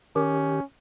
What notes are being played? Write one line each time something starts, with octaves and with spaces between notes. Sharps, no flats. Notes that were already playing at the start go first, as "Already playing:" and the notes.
D#3 C#4 G4